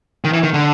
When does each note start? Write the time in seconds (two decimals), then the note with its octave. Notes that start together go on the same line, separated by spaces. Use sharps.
0.24 D#3
0.33 E3
0.44 D#3
0.54 D3